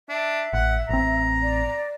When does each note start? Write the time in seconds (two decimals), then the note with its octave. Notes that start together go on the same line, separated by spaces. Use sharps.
0.09 D4 E5
0.53 A1 F#5
0.89 A1 C4 A#5
1.43 D5